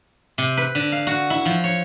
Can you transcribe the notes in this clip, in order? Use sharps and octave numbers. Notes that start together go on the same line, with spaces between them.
C3
B4
D3
F5
F#4
E4
F3
C#5